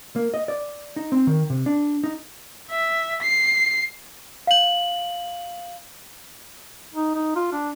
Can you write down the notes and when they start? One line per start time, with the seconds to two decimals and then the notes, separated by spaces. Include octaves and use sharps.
0.16 A#3
0.34 D#5
0.48 D5
0.96 D#4
1.12 C4
1.27 D#3
1.50 C3
1.66 D4
2.04 D#4
2.70 E5
3.22 C7
4.47 F5 F#7
6.94 D#4
7.15 D#4
7.36 F4
7.53 D4